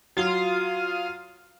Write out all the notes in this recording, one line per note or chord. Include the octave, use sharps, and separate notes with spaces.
F#3 F4 F5 D#6